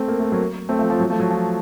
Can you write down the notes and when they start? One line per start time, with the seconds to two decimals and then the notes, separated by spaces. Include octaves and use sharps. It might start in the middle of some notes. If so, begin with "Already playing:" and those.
Already playing: A3 C4
0.08 A#3
0.20 A3
0.32 F#3 A#3
0.69 A3 C4
0.79 F3 A3
0.90 F3
1.00 F#3
1.10 F3 A3
1.20 F#3
1.30 F3